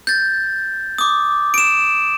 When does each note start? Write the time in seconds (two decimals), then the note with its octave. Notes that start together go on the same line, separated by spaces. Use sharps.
0.07 G6 A6
0.98 D6 D#6
1.54 D7 E7